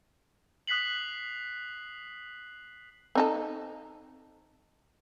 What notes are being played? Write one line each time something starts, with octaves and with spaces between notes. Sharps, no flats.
D#6 F#6 B6 C7 F#7
C4 D#4 A4